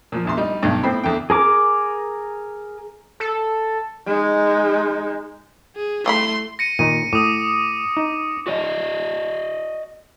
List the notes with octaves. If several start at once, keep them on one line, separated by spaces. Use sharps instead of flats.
A#2 F3
A#1 E2 C6
G3 D#4
B1 G2 B2
A2 B3 C4 C5 G5 B5
E2 D3 G5
G#4 A#4 D6
A4
G#3 D#4
G#4
G3 A3 E4 B5 C6
A#6 C#7 D#7
A#2 D#3 A#5 D#7
A2 D6 D#6
D#4
F#4 D5 D#5